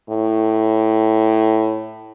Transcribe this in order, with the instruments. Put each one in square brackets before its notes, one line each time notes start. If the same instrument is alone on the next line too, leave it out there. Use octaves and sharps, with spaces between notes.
[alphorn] A2